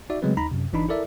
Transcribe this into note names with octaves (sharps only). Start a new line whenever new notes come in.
D#4 F#4 D5 E5
C#3 F#3 G#3 A3 C4 B4
D#2 D#4 A#5 B5
F#2 C3
G1 E3 D4 D#4 B5
E4 A4 A#4 D5 E5